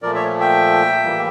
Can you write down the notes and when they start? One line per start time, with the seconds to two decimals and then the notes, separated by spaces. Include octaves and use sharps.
0.02 A#2 F3 A3 A#4 D5
0.14 C#5 E5
0.40 E5 G5
1.03 A2 E3 G3 A#3